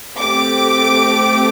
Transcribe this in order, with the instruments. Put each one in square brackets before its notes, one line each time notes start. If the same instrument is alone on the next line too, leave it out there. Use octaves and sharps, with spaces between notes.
[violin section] A3 C4 G4 D6